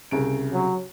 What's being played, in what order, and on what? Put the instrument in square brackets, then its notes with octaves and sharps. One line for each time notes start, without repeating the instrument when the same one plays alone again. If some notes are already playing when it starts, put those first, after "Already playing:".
[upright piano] C2 C#3 D7
[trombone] F#3